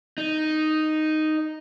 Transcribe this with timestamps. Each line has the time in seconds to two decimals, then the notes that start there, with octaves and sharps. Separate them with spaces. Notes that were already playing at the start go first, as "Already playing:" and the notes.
0.18 D#4